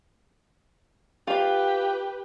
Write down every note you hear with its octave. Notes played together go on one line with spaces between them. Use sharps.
F4 G4 B4 F5